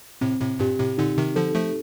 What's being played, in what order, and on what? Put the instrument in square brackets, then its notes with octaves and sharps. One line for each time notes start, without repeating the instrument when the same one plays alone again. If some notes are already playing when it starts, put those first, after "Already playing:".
[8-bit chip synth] A2 C3 [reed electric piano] C4
[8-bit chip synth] A2 C3
[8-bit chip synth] G2 A#2 [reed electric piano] G4
[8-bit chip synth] A2 C3
[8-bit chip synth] A#2 D3 [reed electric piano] D#4
[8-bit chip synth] C3 D#3
[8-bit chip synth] D3 F3 [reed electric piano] A4
[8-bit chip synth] F3 A3